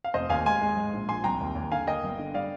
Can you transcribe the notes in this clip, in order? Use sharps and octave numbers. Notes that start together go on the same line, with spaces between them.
F5
F1 C5 D#5
D#2 F5 G#5
G#3 G#5 C6
G#3
G#2
A#1
F3 G#5 C6
C2 G5 A#5
D#2
D#2
D3 F5 G#5
A#3 D#5 G5
G1
D3
G3 D5 F5